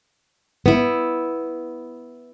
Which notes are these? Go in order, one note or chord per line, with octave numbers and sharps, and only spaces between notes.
B3 E4